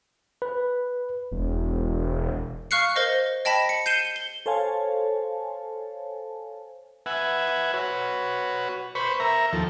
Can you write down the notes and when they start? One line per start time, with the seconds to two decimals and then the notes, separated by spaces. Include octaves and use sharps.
0.42 B4
1.32 E1
2.71 F5 C#6 F6 F#6 C7 C#7
2.96 A#4 C5 D#5
3.45 D#5 G5 A5 B5 B6
3.69 C#7
3.86 G6 C7 C#7 D#7 E7 G7
4.16 G7
4.46 A4 C5 C#5 F5 G#5 A5
7.06 B4 E5 F#5 G#5
7.74 F#4 B4 C#5
8.95 B4 C5 B5 C#6
9.20 A#4 E5 A#5
9.53 D#2 F3 A4